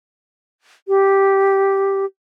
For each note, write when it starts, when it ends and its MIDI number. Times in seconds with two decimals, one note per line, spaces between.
0.88 2.05 67